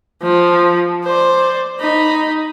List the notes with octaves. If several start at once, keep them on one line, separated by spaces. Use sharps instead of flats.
F3
C5 D5
D#4 B5